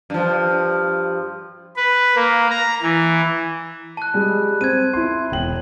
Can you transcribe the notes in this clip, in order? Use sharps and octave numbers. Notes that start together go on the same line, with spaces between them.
G2 F3
B4
A#3
A#5
E3
A5 F#6
G3 G#3
C4 G#6 D#7
E4 C6
E1 G5 F#7